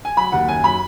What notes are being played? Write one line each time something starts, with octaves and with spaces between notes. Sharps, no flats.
G#5
F#3 B5
D#2 F#5
F#2 G#5
F#3 B5